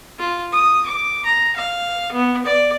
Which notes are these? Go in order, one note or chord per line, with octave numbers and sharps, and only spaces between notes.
F4
D#6
D6
A#5
F5
B3
D5